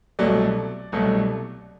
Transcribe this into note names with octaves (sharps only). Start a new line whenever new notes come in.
C2 B2 F#3 A3 D5
C2 B2 F#3 A3